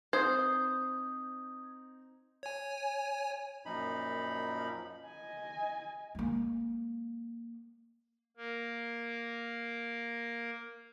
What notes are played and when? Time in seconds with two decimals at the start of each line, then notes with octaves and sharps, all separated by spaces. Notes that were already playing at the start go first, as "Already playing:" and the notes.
0.13 C4 D#4 C5 D#6 G#6
2.43 C#5 G#5
3.65 F#2 A#2 F3 D#4 B5
5.06 D#5 G#5
6.15 G#3 A#3
8.37 A#3 A#4